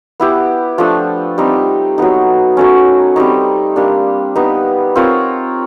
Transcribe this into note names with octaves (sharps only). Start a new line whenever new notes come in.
B3 E4 G4
F3 A3 D4
G3 C4 D#4
F#3 B3 D#4
F#3 A3 C#4
G3 C4 D#4
G3 A#3 D4
B3 D#4 G4 B4
C4 F4 A#4 C#5